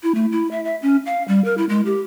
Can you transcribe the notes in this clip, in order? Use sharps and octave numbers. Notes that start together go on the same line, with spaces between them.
E4
A3
E4
E5
E5
C#4
F5
G3
A#4
E4
G#3
G4